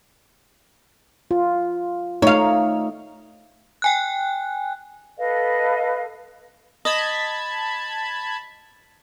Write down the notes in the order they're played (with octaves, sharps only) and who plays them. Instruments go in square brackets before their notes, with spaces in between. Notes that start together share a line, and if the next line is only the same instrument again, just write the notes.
[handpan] F4
[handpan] A3 D#4 [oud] C#5 F5
[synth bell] G5 G#5 F#6
[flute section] A4 B4 D#5 F5
[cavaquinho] D#5 [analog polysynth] A5 B5 G#6